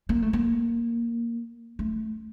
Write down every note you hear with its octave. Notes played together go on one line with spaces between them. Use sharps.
A#3
A3
A#3
A3